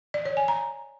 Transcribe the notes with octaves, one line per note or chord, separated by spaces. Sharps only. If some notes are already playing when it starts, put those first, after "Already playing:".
D5
C#5
G#5
A#5